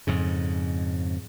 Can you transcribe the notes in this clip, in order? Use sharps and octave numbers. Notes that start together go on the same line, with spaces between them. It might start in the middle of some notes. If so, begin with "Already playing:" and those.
F2 G#2 C#3